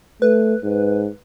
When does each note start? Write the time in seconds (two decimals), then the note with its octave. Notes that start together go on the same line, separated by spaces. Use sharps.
0.22 A3 B4
0.63 G#2